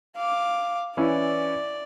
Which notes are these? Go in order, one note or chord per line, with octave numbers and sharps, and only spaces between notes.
F5 D6
E3 C#4 E4 D5